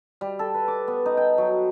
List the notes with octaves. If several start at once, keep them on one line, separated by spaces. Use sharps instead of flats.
G3
A4
B4
D6
B3
D#4
G5
F#3